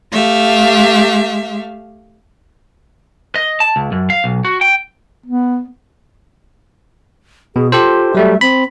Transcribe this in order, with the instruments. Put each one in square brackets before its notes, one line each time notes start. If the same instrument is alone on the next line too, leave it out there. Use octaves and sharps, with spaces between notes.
[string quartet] A3 G4 E5 F5
[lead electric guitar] D#5
A5
C#2
F#2
F5
B1
F#4
G5
[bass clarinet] B3
[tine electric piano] B2 [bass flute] G#4
[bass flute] F4 [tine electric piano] G4 A4 C5
[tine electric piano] F#3 G3 A3 [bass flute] E5
[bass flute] C4 [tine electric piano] B5